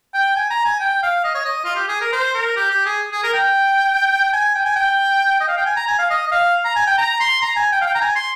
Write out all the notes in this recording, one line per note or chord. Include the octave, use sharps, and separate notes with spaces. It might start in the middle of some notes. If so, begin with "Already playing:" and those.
G5
G#5
A#5
G#5
G5
F5
D#5
C#5
D#5
F4
G4
G#4
A#4
C5
A#4
G4
G4
G#4
G#4
A#4
G5
G#5
G5
G#5
G5
D#5
F5
G5
G#5
A#5
G#5
F5
D#5
D#5
F5
A#5
G#5
G5
A#5
C6
A#5
G#5
G5
F5
G5
A#5
G#5
C6